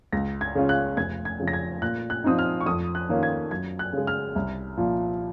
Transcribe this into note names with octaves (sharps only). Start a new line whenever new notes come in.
C#2 A#6
G#6
C#3 G#3 C#4 F4
F#6
F1 G#6
G#6
F2 C#3
A#6
G#6
A#2 F#6
F#6
F3 C4 D#4 D#6
F6
C#6
F2 D#6
F#6
D#3 A#3 C#4 F4
G#6
F#2 G#6
F#6
C#3 G#3
F6
C2
A#2 F3